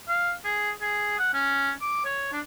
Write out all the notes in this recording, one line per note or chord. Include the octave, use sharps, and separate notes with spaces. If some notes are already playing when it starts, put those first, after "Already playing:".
F5
G#4
G#4
F#5
C#4
D6
C#5
D4